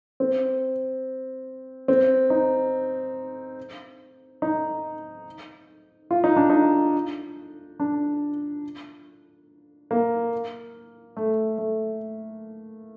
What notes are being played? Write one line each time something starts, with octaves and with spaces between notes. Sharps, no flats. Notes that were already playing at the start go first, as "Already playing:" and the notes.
C4
C4
D#4
D#4
F4
D#4
D4
D#4
D4
A#3
A3
A3